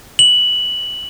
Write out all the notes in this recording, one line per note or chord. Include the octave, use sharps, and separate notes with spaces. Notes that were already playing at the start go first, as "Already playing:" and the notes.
F#7